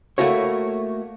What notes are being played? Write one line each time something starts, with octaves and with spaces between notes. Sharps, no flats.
A3 A#3 E4 F#4 C#5